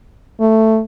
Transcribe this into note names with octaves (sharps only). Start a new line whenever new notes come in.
A3